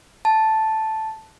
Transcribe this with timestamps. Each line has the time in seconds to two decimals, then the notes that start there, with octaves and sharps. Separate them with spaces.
0.25 A5